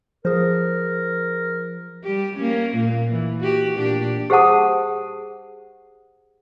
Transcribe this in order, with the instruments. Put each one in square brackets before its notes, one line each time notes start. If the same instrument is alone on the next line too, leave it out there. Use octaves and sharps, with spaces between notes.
[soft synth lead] F3 [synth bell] G#4 C5 [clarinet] A#4
[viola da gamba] G3 G4
A#3 C#4
A#2 A#3
E3
F#4 G4
A#2 D4 G4
[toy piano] G4 G#4 C5 F#5 A5 D#6